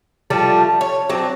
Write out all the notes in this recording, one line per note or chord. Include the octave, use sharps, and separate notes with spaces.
F3 G3 A3 D4
C#5
F#3 C4 D4